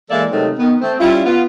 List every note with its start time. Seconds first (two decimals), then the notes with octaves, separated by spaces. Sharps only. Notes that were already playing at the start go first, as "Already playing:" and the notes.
0.10 E3 G#3 A#3 A4 D5 E5
0.31 C3 D#3 F#3 G#3 A3 C4
0.58 D#3 B3
0.81 A3 C4
0.99 G3 C#4 E4 F4
1.25 B3 F4